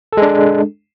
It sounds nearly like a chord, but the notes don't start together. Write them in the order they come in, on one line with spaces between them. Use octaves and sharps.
A4 G#3 D4